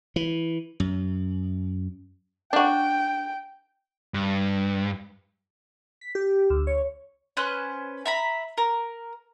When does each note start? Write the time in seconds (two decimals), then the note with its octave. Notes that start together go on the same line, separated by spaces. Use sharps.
0.16 E3
0.80 F#2
2.53 D4 F#4 G5
4.14 G2
6.01 B6
6.15 G4
6.50 D2
6.67 C#5
7.37 C#4 B4 C5 F#6
8.06 E5 A#5 B5
8.58 A#4